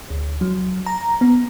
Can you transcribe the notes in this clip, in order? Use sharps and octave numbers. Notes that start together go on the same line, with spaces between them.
D2
F#3
A#5
B3